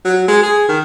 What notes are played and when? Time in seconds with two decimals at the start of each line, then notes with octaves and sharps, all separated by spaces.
0.05 F#3
0.28 G#3
0.43 G#4
0.68 D#3